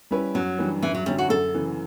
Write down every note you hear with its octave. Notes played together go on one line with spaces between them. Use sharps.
G3 C#4 E4 B4
F#2 F#3
E3 G3 D4
F#2 E3
F#3
D3 F#3 G3 C#4
F#4
F#2 A4
C#3 E3